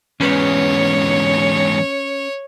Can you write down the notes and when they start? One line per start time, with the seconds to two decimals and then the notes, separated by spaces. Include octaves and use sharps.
0.20 E2 G#2 C#4 B4 C#5